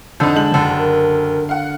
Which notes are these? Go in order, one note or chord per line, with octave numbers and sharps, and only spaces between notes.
F2 D3 D#4 G6
G#3 A5 F#7
F#1 D3
A#4
F5 F#5